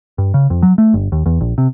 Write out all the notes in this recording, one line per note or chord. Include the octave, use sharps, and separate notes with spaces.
G2
C#3
F2
F#3
A3
G1
D#2
E2
A#1
C3